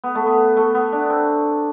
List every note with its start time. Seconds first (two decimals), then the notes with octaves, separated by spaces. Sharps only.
0.04 B3
0.15 A3
0.26 B3
0.57 A3
0.75 B3
0.92 D4
1.10 C4